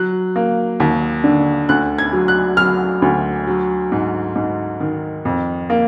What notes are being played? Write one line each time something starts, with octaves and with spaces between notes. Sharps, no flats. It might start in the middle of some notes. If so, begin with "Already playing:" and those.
Already playing: F#3 F#6
A#3
D#2
D3
D2 F#6
G#6
F#3
F#6
F#3 F6
D2
F#3
G#2
G#2
D#3
F2
A#3